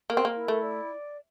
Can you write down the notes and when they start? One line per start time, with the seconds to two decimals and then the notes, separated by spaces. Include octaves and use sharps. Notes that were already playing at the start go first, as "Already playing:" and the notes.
0.10 A#3 A#4
0.17 C4
0.25 A#3
0.35 E4
0.48 A3
0.62 D5